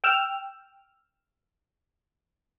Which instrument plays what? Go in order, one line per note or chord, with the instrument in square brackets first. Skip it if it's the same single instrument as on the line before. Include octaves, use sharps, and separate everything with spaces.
[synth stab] G5 E6 F6